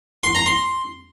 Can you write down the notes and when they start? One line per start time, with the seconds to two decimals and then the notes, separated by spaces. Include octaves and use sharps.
0.23 C6
0.35 A#5
0.46 C6